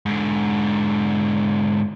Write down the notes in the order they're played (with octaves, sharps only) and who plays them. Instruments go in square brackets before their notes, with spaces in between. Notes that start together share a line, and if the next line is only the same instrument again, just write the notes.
[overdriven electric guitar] G#2 D3